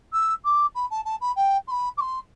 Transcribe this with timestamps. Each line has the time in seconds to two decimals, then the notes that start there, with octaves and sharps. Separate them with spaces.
0.13 E6
0.45 D6
0.75 B5
0.90 A5
1.05 A5
1.21 B5
1.36 G5
1.67 C6
1.71 B5
1.97 D6
2.00 C6